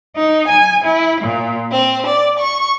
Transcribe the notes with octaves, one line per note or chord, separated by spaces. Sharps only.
D#4
G#5
E4
A#2
C4
D5
C#6